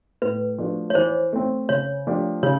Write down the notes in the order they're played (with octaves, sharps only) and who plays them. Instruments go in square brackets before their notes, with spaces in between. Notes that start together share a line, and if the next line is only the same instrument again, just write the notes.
[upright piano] A2 [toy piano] B4
[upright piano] F3 A3 D4 F#4
[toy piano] C#5
[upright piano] E3 [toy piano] C5
[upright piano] A3 C4
[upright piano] C#3 [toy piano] C#5
[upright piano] F3 A3 D4 G4
[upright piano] C#3 [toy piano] C#5